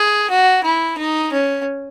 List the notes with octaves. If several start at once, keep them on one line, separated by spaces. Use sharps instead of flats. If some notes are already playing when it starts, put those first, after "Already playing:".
Already playing: G#4
F#4
E4
D#4
C#4